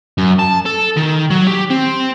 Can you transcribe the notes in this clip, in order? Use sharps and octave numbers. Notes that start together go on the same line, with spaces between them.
F#2
A5
A4
D#3
F#3
G4
C4